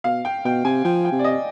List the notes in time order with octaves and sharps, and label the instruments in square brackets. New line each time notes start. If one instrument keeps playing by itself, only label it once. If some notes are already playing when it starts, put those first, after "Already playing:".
[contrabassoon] B2 [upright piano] F5
[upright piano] G5
[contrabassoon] B2 [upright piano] G5
[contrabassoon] C3 [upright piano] G#5
[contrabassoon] F3 [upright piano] G5
[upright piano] G5
[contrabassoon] C3
[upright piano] D5
D#5